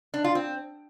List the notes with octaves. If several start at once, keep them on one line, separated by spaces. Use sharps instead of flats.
D4
F4
C4